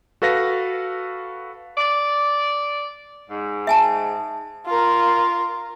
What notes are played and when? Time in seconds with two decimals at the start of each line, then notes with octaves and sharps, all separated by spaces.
0.22 F#4 A4 B4 F5 A#6
1.78 D5
3.30 G#2
3.67 E5 G#5 A5
4.66 F4 A#4